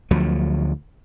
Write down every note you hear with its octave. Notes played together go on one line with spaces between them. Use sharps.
D2 F3 F#3